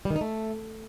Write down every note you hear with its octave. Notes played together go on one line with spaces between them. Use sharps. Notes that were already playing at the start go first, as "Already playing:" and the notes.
G3
D#3
D#4
A3